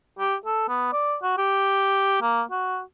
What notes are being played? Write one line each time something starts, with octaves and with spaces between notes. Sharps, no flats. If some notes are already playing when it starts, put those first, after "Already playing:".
G4
A4
B3
D5
F#4
G4
A#3
F#4